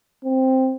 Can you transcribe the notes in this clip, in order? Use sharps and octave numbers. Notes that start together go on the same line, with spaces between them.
C4